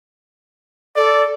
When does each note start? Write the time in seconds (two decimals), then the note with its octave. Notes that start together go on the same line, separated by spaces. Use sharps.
0.96 A4 D5